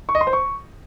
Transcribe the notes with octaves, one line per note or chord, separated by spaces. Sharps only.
C#6
D#5
C6
C5
C#6